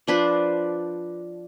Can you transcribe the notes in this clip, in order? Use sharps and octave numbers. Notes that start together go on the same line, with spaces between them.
F3 D4 B4 C5